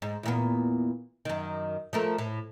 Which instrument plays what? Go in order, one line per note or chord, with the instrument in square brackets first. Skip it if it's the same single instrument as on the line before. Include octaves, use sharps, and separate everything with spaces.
[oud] G#2
E2 A#2 B3
F#2 D#3
F3 A3 A#4
A2